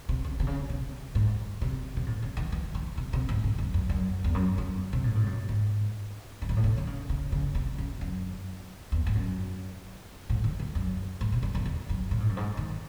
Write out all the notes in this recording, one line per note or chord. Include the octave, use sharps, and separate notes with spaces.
C3
C#3
C3
C#3
C3
G#2
C3
C3
A2
C#3
D#3
E3
D#3
C3
C3
G#2
G#2
F#2
F#2
F#2
E2
F#2
F#2
C3
A2
G#2
F#2
G#2
F#2
G#2
A2
C3
D#3
C#3
C#3
C#3
C3
C#3
F#2
E2
G#2
F#2
A2
D#3
E3
F#2
G#2
C3
F#2
E2
E2
F#2
A2
G#2
F#2
G#2
D#3